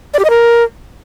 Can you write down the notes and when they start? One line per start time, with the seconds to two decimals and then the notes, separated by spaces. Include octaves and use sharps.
0.14 D5
0.19 G4
0.25 D#5
0.30 A#4